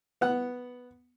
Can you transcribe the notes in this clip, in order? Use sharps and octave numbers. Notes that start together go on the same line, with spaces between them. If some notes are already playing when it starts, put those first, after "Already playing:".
B3 F#5